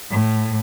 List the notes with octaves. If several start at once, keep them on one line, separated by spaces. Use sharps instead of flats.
A2